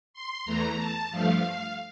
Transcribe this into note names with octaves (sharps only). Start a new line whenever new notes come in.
C6
E2 E3 A3 A#5
A5
G2 F3 A3 F5